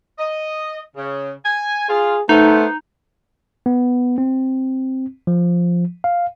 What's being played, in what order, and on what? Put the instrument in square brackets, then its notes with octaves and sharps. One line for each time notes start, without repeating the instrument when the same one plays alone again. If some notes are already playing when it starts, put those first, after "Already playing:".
[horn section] D#5
C#3
G#5
[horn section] F4 [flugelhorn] G#4
[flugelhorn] A3 [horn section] B3 C5 [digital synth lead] D#4
[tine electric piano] B3
C4
F3
F5